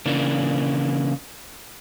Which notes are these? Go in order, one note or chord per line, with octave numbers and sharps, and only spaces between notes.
C#3 E3 A#3 D4